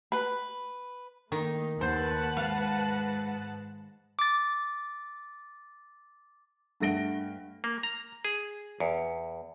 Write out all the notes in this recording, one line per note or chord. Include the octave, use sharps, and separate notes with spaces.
B4 B5
D#3 A3 A#3 D#4
D#2 B4 C5 F#5 A5
G#2 F5
D6 A6
G2 A3 F#5 A#6 D7 G7
A#3
A#5
G#4
E2